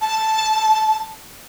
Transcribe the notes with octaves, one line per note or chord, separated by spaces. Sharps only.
A5